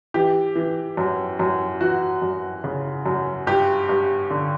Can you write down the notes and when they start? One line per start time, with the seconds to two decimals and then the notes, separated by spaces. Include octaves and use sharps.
0.14 E3 G4
0.56 E3
0.97 F#2
1.39 F#2
1.81 E3 F#4
2.22 F#2
2.64 C#3
3.06 F#2
3.47 G2 G4
3.89 G2
4.31 D3